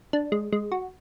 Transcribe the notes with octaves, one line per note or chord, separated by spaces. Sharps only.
D4
G#3
G#3
F#4